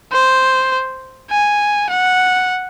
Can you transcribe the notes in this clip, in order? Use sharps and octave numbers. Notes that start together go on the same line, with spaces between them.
C5
G#5
F#5